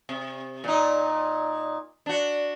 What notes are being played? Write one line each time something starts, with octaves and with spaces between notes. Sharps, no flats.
C3
A#2 D#4
D4 F#4